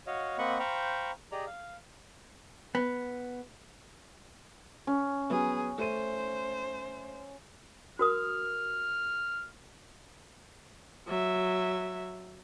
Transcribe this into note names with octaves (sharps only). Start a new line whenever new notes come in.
F#4 C#5 D#5 F5
A#3 C4 D#5 F#5 B5 C#6
C5 F5 G5 A#5 B5 C#6
G4 G#4 D5 D#5 A#5
F5
B3
C#4
F#3 B3 G#4
A3 C5 D#7
F#4 A#4 D#6 F6
F#3 E5